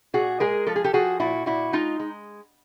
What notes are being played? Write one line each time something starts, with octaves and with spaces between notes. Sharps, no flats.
A#2 F#4 G#4
G#3 G#4 A#4
F3 A4
G#4
G4 A4
F3 F#4 G#4
A#2 E4 F#4
A#2 E4 F#4
G#3 D#4 F4
G#3